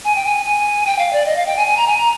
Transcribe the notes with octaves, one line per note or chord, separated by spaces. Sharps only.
G#5
G5
G#5
G#5
G5
F5
D5
D#5
F5
G5
G#5
G#5
A#5
G#5
A#5